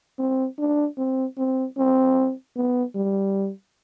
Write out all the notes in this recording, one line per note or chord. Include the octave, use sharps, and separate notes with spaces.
C4
D4
C4
C4
C4
B3
G3